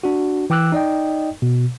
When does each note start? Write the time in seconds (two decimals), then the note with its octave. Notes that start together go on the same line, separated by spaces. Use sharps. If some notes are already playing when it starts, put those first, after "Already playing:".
0.04 D4 F#4
0.50 E3 G5 D6 E6 F#6
0.72 D#4 D5 D#5 G5
1.42 B2